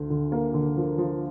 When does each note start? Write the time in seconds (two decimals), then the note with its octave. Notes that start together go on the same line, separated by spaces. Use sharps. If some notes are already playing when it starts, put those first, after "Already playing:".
Already playing: D2 D3
0.10 D3
0.32 A#3
0.54 D3
0.77 F3
0.98 F3